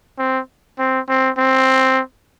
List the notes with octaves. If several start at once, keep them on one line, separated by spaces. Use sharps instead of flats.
C4
C4
C4
C4